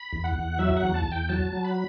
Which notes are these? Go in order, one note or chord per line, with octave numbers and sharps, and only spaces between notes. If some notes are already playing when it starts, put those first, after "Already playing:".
Already playing: B5
E2
F#5
E2
F#3 E5
F#5
E2
A5
E2
G5
F#3 A5
F#3
B5